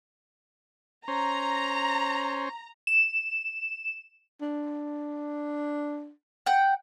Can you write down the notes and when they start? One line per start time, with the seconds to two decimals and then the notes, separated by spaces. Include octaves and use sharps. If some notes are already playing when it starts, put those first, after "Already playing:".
1.08 C#4 C5 A#5
2.87 E7
4.42 D4
6.46 F#5 G5